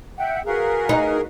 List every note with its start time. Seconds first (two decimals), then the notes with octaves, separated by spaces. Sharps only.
0.17 E5 F#5 G5
0.46 F#4 G#4 A#4 B4 F5
0.89 D#4